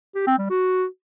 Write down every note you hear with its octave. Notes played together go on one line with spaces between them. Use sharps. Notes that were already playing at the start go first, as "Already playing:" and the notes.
G4
C4
G3
F#4